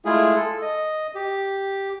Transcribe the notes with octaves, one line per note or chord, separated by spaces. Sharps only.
G#3 A3 E4 F4 G#4
A4
D#5
G4